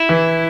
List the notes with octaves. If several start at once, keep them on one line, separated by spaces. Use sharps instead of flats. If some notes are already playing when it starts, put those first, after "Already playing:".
Already playing: E4
E3